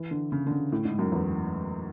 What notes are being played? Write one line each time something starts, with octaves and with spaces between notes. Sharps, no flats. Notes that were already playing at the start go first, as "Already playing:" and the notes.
Already playing: E3
D3
C#3
D3
C#3
A2
G#2
F#2
E2